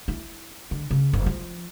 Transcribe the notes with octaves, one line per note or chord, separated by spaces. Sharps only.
E4
D3
C#3
F#1
F3